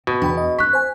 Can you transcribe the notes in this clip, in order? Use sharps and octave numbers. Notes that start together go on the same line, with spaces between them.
B2 C4
E2 D4 G5 B5
D#5
C4 C#4 C#6 F#6 B6
C5 G#5